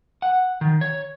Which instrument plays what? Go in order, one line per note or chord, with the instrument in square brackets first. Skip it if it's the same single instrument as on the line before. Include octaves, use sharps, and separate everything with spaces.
[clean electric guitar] F#5
D#3
C#5